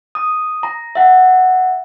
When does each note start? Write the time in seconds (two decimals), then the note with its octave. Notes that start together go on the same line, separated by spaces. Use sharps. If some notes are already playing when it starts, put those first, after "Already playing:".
0.15 D#6
0.63 A#5
0.95 E5 F#5